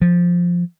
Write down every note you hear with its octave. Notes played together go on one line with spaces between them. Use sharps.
F3